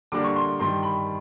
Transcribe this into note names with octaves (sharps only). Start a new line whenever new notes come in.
D3 G3 A#3 D4 D6
C#6
C6
G2 D#3 G3 C6
B5